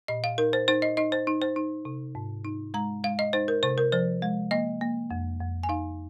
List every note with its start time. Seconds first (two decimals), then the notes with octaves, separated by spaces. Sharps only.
0.08 A#2 D#5
0.24 F5
0.38 D#4 A#4
0.53 C5
0.68 D#4 C5
0.82 D#5
0.97 D#4 D#5
1.12 C5
1.27 D#4
1.42 C5
1.56 D#4
1.85 C3
2.15 G#2
2.45 D#4
2.74 G#3 A#5
3.04 G#3 F5
3.19 D#5
3.33 D#4 C5
3.48 A#4
3.63 C3 C5
3.78 A#4
3.92 F3 C5
4.22 G#3
4.51 A#3 D#5
4.81 A#3
5.11 F2
5.40 F2
5.63 G#5
5.69 D#4 F5